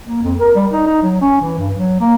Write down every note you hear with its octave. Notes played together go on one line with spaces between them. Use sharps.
A#3
F2
A#4
G3
D#4
D#4
F#3
C#4
E3
G2
F#3
A#3